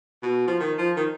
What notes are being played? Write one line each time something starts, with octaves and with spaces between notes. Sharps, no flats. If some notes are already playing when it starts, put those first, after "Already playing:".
B2
F3
D#3
F3
D#3